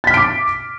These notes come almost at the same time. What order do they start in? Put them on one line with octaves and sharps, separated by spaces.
A6 B6 F6 D7 D6